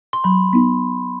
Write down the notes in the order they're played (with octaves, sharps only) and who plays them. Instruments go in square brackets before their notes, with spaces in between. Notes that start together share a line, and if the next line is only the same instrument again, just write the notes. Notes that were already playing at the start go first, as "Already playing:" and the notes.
[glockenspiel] C6
[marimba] F#3 [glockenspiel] B5
[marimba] B3 D#4